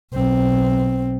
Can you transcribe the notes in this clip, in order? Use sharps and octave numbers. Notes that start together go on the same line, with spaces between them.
B1 C4